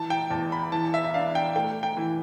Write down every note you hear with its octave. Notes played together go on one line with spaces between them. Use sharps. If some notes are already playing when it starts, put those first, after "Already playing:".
Already playing: E3 A5
G5
E2 A5
B5
E3 A5
E5
E5
D4 F5
G5
A3 G5
G5
E3